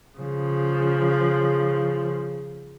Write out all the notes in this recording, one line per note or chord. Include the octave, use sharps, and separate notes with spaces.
C#3 F3